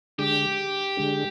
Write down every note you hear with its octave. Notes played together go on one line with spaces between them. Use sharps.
D3 G#3 D4 G4 G#4
D3 G#3 D4 G#4